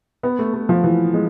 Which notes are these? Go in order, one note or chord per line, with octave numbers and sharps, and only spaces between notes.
B3
A3
A3
F3
E3
G#3